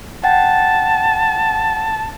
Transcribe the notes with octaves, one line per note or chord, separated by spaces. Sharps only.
F#5 G5 A5 A6